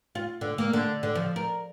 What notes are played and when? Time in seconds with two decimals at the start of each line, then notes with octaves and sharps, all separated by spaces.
0.15 F4
0.41 D3
0.58 A#3
0.73 D3
1.03 D3
1.15 F3
1.36 A#4